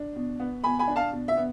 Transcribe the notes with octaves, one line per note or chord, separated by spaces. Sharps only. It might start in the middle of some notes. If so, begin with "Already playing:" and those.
Already playing: D4
B2
B3
B2 G#5 B5
G#5 B5
D4
F5 A5
B2
E5
B3